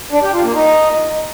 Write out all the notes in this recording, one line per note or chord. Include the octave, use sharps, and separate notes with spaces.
D4
G4
F4
A#3
D#4